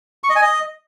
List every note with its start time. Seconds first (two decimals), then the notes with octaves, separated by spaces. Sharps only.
0.24 C#6
0.30 D#5
0.36 G#5
0.42 D#5